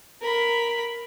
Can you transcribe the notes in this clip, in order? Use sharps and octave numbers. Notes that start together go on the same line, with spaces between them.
A#4 B5